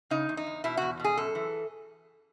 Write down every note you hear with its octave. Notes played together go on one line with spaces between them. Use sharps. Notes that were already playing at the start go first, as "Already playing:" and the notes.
C#3 D#4
E2
D#4
E2
B2 E4
E2 F#4
B2 G#4
F#2 A4
E3